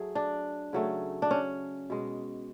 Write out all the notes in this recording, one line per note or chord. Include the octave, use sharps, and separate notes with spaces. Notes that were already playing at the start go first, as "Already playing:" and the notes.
Already playing: F#3 A3 G#4
D4
C#3 F#3 A3
D4
C#4
B2 G#3